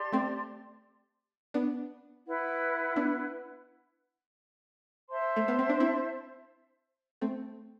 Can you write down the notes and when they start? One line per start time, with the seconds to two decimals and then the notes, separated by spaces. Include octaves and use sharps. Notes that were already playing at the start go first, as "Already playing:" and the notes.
Already playing: G4 D5 A5 C6
0.12 A3 C4
1.54 B3 D4
2.26 E4 B4 F#5
2.96 B3 D4
5.10 C5 E5 A5 C6
5.36 A3
5.48 B3
5.59 C4
5.69 D4
5.80 C4 E4
7.21 A3 C4